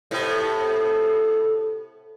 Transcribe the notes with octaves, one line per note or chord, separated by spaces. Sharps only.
A2 C3 B3